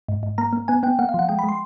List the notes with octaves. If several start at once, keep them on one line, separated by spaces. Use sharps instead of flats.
G#2
G#2
A#3 A#5
A#3
B3 G#5
B3 G5
A#3 F#5
F5
F3 F#5
G#3 G5
B5
G#3 C6